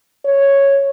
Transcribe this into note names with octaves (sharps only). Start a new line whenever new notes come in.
C#5